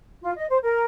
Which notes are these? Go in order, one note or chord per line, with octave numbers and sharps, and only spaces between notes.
F4
D#5
C5
A#4